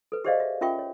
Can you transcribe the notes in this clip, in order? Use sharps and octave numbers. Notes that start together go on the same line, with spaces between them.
A4 B4
G4 G#4 C5 D5 D#5 F5
E5
C#4 F4 A#4 E5 G5 C#6
C#5